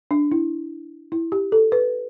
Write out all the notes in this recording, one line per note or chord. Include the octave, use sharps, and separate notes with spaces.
D4
E4
E4
G4
A4
B4